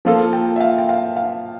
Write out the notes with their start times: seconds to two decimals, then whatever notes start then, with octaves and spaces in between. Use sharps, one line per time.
0.05 F3 A#3 F4 A4
0.33 G5
0.56 E5
0.60 F5
0.78 G5
0.89 F5
1.16 F5